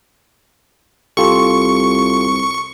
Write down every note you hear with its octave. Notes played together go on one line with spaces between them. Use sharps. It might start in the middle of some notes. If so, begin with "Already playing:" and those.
C2 F4 G4 A4 C#6